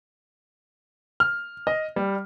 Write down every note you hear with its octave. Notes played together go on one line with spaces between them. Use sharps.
F6
D#5
G3